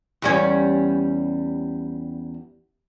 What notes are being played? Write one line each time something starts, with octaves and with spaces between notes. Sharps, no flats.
E2 G3 C#4